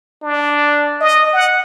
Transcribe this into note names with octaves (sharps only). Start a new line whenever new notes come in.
D4
D#5
F#5